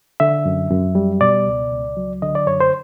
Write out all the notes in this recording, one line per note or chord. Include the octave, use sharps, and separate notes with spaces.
D3 E5
F#2
F#2
G3
B2 D5
C#2
C#2
F#3
D3 D#5
D5
F#2 C#5
C5